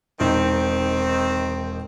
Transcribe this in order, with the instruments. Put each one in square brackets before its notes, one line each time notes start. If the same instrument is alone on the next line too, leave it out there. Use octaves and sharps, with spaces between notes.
[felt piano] E1 D#4 D#5 [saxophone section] D#3 C4